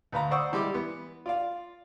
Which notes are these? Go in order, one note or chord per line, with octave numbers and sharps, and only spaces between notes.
D2 B4 F5 A#5
C5 D5 F#5 C#6 D#6 E6
E3 G3 G#3 E4 G4
E3 B3
F4 D5 F5